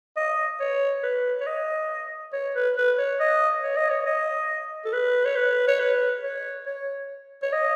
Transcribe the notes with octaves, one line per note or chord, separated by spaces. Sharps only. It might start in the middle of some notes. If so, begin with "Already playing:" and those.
D#5
C#5
B4
C#5
D#5
C#5
B4
B4
C#5
D#5
C#5
D#5
C#5
D#5
A4
B4
C#5
B4
C#5
B4
C#5
C#5
C#5
D#5